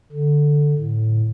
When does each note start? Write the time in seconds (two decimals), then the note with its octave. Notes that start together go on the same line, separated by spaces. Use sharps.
0.12 D3
0.78 A2